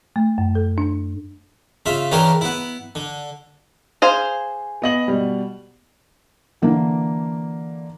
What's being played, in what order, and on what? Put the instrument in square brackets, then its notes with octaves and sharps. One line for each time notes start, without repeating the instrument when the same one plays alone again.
[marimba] A3
F#2
A4
D4
[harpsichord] C#3 F4 E5
C#3 E3 C#4 D4 G4 A#4
B3 E4
D3
[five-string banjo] G#4 C5 F5
[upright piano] B3 D#5 F#7
B2 G3
[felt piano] D3 E3 A#3 D4